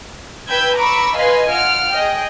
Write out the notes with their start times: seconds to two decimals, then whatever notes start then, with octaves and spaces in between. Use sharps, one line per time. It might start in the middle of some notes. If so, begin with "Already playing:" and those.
0.49 B4 G5 B5 E6 G6 G#6
0.78 A#5 B5 C#6 D6 E6
1.18 B4 D#5 F5 G#5 B5 C6
1.49 F4 F#5 F6 D7
1.91 G#4 D#5 G5